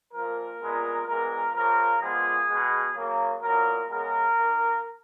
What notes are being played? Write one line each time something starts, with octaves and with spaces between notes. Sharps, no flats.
A#2 F3 A#3 A#4
A#2 G#3 B3
A#2 G#3 B3 A#4
C#3 F3 A#3 A#4
A#2 F3 G#3 B3 G#4
B2 G#3 B3
C#3 F#3 A#3
A#2 F#3 B3 A#4
C#3 G#3 B3 A#4
D#3 A#3